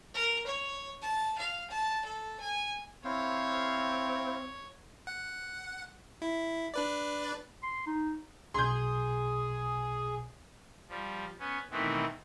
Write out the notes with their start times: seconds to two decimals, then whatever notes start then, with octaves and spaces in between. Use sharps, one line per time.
0.14 A#4
0.47 C#5
1.02 A5
1.38 F5
1.70 A5
2.05 A4
2.40 G#5
3.05 C4 E4 C5 C#5 F5
5.07 F#5
6.22 E4
6.74 D4 B4 D5
7.63 C6
7.87 D#4
8.54 B1 B2 G#4 C6 G6
10.89 F3 G3
11.39 B3 C#4
11.71 B2 D#3 E3 A3 B3 C4